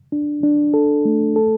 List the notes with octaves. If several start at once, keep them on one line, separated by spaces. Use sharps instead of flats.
D4
D4
A4
A3
A4